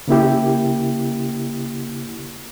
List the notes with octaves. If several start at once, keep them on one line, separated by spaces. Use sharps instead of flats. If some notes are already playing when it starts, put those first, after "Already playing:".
C#3 A#3 E4 G4